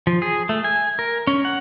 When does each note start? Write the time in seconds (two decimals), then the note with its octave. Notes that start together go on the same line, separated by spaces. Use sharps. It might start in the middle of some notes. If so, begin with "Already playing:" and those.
0.07 F3
0.22 G#4
0.49 A3
0.64 G#5
0.99 A#4
1.27 C#4
1.45 F#5